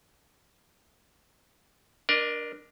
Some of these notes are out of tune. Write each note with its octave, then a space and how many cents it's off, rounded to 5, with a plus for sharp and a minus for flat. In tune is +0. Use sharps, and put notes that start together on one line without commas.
D4 +0 A#4 +20 D#5 -40